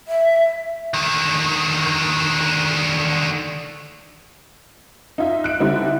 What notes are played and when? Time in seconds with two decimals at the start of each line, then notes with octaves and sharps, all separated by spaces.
0.08 E5
0.94 D3 D#3
5.18 D#4 F4 E5
5.44 F#6 D7
5.60 D3 G3 C4 D#4 E4